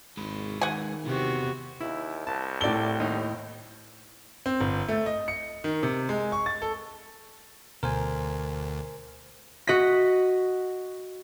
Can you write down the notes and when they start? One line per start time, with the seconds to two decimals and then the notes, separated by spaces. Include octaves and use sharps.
0.17 G#1 G#3 B4
0.61 D#3 F#5 G#5
1.05 C3 E3 B3 F#4
1.81 D#2 E4
2.27 C2 A5
2.61 A2 A4 D5 G7
3.00 D#2 D#4
4.46 C4
4.61 G1
4.88 A3
5.06 D#5
5.28 C#7
5.64 D#3
5.83 C3
6.09 G#3
6.32 C#6
6.46 A6
6.62 A4
7.83 D2 B2 A#4 C5 G#5
9.67 F#4 D#5 B6